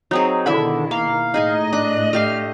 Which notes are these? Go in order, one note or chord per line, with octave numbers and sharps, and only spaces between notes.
F#3 C4 D#4 G#4
B2 D3 D#3 E4 E5 B5
A#3 F5
A2 D#4 G#4 D#5 G#5
D4 F#6
A3 G4 F5 F6